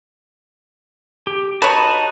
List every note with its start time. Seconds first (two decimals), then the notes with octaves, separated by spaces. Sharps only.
1.27 G4
1.62 D#4 F#4 B4 C#5 A5